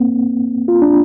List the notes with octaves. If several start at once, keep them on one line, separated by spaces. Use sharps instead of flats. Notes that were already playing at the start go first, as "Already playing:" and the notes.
Already playing: A#3 C4
F4
D4